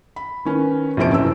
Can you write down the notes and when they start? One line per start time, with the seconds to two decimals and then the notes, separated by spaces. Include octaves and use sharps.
0.16 B5
0.45 D#3 C#4 B4
0.97 A#1 F2 C3 C#4 C5 D7
1.12 F1 F#2 E3 F#3 E6